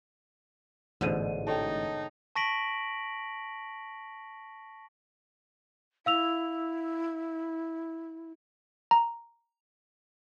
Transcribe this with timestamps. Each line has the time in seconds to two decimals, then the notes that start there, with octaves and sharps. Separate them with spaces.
1.01 A1 G#2 B2 D3 D#7
1.47 D#4 A4 C#5 G5
2.36 A5 C#6 A#6 B6 D7 F#7
6.06 E4 F5 E6 F7
8.91 A#5